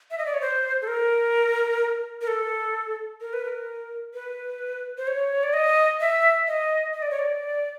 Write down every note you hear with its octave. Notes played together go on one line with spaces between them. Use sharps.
E5
D#5
D5
C#5
C5
A4
A#4
A#4
A4
A#4
B4
A#4
B4
C5
C#5
D5
D#5
E5
D#5
D#5
D5
C#5
D5